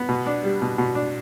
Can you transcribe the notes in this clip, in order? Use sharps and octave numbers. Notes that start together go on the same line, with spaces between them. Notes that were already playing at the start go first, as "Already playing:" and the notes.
Already playing: B3
B2
D4
G3
B2
B2
D4